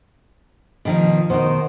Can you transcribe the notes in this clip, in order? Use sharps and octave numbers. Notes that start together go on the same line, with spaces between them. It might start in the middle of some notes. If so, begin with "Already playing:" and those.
B2 D#3 F3
B2 D#3 C5